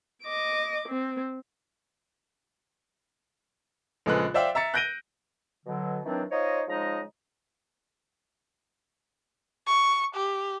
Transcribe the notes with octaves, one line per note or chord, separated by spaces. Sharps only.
D#5 D6
C4
A#1 C#3 G#3 A4 B4 F#6
C5 D5 E5 F5 G5
E5 A#5 A6 C#7
F#6 G6 A#6 D7 D#7 G7
B2 D3 F#3
D#3 E3 F#3 C4 D4
D#4 F4 C5 C#5 D#5
C#3 F3 G#3 D#4 D#5 A#5
C#6
G4